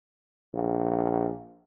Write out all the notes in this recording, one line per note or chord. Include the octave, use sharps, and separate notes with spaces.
A#1